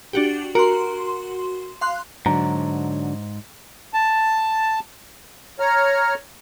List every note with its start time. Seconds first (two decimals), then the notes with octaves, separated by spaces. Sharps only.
0.13 D4 F#4 G4
0.55 F#4 A#4 C6
1.81 F5 C6 F#6
2.26 G#2 D3 F#3 D4 A#5
3.94 A5
5.60 C#5 A#5 F6